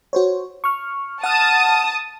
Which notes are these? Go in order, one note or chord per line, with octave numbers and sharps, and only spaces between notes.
F#4 C5 C#5
C#6 F6
F#5 A5 D#6 F6